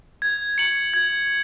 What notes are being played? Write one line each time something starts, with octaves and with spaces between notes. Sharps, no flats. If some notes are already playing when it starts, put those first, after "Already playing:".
G#6
C#7 F#7
G#6